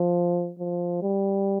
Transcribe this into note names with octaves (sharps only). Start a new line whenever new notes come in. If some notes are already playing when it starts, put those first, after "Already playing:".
Already playing: F3
F3
G3